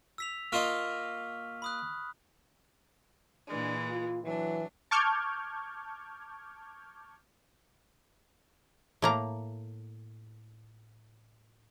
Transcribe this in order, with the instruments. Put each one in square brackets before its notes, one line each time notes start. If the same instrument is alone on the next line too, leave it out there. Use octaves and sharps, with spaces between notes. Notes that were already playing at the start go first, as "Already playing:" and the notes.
[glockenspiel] E6 B6 F7
[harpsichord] A#3 F4 D#5 [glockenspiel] C#6 F6 B6
[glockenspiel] B5 D#6 F#6
[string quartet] A#2 E3 G#3 [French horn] D4
[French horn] F4
[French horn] E3 [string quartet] F#3 D4
[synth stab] A5 C#6 D6 F6 G6 G#6
[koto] A2 A#3 A#5